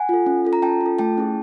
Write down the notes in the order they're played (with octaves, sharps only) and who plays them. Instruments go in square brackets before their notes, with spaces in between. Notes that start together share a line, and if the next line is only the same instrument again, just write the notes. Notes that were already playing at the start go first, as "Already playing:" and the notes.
Already playing: [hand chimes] F#5 G#5
F4 A4
C#4
F4 A4
A#5
C#4 G5 A5
F4 A4
A3 G5 A5
C#4 E4 G#4